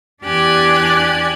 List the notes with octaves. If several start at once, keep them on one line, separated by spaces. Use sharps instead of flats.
E2 D4 G4 D5 G#5 F#6